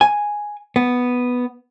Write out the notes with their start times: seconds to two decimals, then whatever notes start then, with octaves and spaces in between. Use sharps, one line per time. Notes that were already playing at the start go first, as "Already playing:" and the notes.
0.01 G#5
0.76 B3